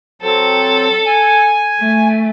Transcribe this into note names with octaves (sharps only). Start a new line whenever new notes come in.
F#3 C4 A4
G#5
A3